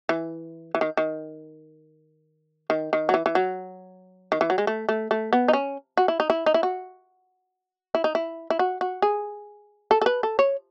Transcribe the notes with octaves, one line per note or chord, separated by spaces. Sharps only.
E3
E3
D#3
D#3
D#3
D#3
F#3
E3
E3
F#3
D#3
E3
F#3
G#3
A3
A3
A3
B3
D#4
C#4
F#4
E4
D#4
E4
D#4
E4
F#4
E4
D#4
E4
E4
F#4
F#4
G#4
A4
A4
B4
A4
C#5